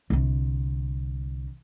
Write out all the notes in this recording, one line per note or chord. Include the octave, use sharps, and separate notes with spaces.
C2 D3